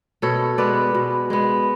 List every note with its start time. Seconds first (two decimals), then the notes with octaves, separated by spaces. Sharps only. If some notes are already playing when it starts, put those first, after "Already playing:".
0.22 B2 A4 C#5
0.58 G#3 B3 B4 D5
0.95 B2
1.30 G#3 B3